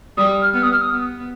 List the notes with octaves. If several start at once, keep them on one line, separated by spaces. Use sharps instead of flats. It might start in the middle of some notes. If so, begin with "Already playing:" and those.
G3 D#6
F6
B3 F6
D#6
F6
D#6
B3